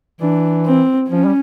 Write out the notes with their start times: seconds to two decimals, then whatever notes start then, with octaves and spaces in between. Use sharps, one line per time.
0.21 E3 D4
0.66 C4
1.09 F3 C#4
1.25 G3